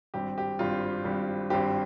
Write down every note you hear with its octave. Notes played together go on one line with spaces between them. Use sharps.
G#1 G2 G3 C4 G4
G4
G#1 G2 G3 C4 F4
G#1 G2 G3 C4
G#1 G2 G3 C4 G4